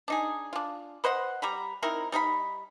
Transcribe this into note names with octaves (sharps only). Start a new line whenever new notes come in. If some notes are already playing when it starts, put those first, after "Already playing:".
D4 D#4 G#4
D4 F4
B4 C5 D#5 F#5
G3 A#5 B5
C4 D#4 E4 A#4
G3 D#4 C5 B5